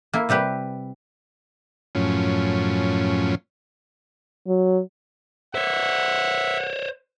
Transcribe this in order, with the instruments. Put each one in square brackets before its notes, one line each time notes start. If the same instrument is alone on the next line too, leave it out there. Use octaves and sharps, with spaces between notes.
[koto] A#3 E4
C3 G3 G4 B4
[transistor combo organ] F#2 A2 F3 C#4
[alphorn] F#3
[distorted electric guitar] C5 C#5 [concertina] E5 [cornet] F#5